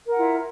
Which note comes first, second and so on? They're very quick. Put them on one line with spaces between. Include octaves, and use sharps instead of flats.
A#4 F#5 F4 E4